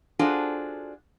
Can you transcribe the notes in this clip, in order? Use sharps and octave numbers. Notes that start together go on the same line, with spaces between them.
D4 F4 F#4 G#4 A4 C5